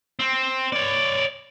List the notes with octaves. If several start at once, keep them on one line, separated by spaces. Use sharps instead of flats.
C4
C#5 D5